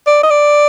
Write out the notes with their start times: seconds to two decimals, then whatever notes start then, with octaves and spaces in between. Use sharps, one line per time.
0.07 D5
0.23 D#5
0.31 D5